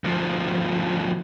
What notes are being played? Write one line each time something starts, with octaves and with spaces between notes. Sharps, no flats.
D2 F3